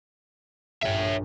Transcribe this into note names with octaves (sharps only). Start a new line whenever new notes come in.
A#1 G2 C#5 E5